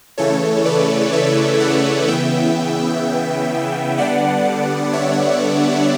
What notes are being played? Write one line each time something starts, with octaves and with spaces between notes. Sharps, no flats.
C#3 E3 A3 A4 C#5
B4 D5
C#5 E5
D5 F#5
C#3 E3 B3 E5 G5
D3 G3 B3 D4 D5 F#5
C#5 E5